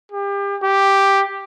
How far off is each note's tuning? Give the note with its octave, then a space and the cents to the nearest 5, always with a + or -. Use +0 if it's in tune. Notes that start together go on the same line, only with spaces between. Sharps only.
G4 +35
G4 +5